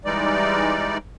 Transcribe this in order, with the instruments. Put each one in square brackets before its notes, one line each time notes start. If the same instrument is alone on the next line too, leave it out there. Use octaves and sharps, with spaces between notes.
[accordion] E3 G3 G#3 D#4 D5